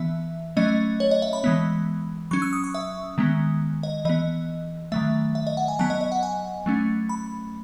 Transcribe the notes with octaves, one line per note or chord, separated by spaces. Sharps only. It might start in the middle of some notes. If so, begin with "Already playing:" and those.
Already playing: E3 B3 E5
F#3 A3 C#4 D#5
C#5
D#5
E5
B5
E3 G#3 B3
F#3 C#4 C#6
E6
D#6
C#6
E5
D#3 G#3 B3
D#5
E3 B3 D#5
D#3 F#3 A3 E5
E5
D#5
F#5
G#5
F#3 B3 A5
D#5
D#5
F#5
G#5
F#3 A3 C#4
B5